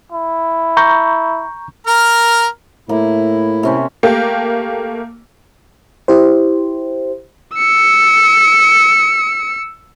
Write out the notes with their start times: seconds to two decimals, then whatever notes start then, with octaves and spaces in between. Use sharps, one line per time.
0.12 E4
0.77 A#5 C#6 G6
1.87 A#4 A#5 F6
2.89 A2 A#3 E4
3.63 C3 C#4 C5
4.03 A3 A#3 G4
6.08 E4 G4 C5
7.57 E6 C#7